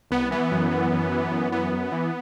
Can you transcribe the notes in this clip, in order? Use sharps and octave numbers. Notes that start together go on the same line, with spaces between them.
C2 B3
E3 B3
F#2
E3
F#2
E3
F#2
E3 B3
F#2
E3